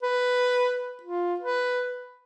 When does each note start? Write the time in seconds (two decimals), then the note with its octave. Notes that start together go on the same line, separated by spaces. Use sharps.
0.03 B4
1.03 F4
1.40 B4